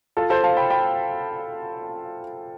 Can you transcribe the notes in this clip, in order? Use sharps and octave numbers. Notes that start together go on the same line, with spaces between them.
F4 A4
A4 C5
F5 A5
G5 B5
G5 B5